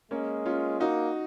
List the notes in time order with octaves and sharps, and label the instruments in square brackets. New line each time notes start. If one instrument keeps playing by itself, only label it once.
[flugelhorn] G#3 [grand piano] A#3 C#4
[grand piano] C#4 F4
[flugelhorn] A#3 [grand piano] D#4 F#4